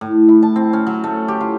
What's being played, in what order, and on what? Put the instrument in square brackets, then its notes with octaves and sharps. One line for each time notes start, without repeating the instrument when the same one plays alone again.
[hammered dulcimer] A2
E4
A5
C4
C#4
F#3
A3
G4
F4